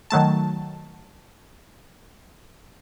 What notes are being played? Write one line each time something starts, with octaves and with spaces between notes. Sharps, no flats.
D#3 F#3 A3 A5